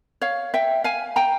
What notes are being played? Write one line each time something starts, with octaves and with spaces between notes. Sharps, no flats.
C#5 F5
E5 G5
F5 G#5
G5 A#5